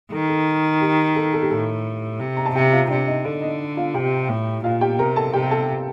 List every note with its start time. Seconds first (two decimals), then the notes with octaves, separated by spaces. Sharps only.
0.11 D#3 A4
0.29 A4
0.81 G4
1.16 A4
1.33 A4
1.42 G4
1.50 A2 A4
2.20 C3
2.37 A#5
2.46 A5
2.55 C3 G4 G5
2.72 F4 F5
2.90 C3 D4 D5
3.07 D#4 D#5
3.24 D3 A4
3.42 D#4 D#5
3.77 F4 F5
3.94 C3 G4 G5
4.29 A2
4.64 A#2 F4 F5
4.81 G4 G5
4.99 C3 A#4 A#5
5.16 A4 A5
5.33 C3 G4 G5
5.51 A4 A5